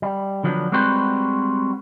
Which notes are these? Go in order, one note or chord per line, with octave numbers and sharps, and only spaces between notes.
G3
D3 F3 F#3 B3 D4
G3 G#3 C4 F#4 B4 C5